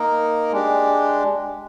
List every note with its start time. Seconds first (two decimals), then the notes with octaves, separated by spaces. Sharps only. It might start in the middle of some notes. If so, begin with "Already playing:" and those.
Already playing: A#3 D#4 A#4
0.51 G#3 D4 G4